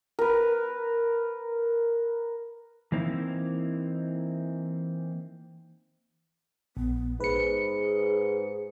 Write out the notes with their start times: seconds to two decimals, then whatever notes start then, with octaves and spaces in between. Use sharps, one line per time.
0.19 A#4 B4
2.92 E3 A#3 C4 D#4 E4
6.77 A#1 B3
7.20 G#2 G#4 B4 C#7